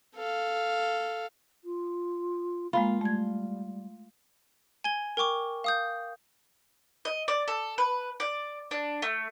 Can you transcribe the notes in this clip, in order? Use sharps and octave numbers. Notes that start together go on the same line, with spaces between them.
A4 F5
F4
G#3 A#3 F4 F5 A#5 B5
G3 A3 G#6
G#5 G#6 G7
A#4 G5 C#6 D6
F5 D#6 G6
D#5
D5
A4
B4
D5
D4
A3